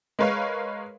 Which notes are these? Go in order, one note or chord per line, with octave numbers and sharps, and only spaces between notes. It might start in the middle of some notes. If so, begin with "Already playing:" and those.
G#3 A#4 B4 C#5 F5